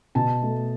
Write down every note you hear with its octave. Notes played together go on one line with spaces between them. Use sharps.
B2 A5
A3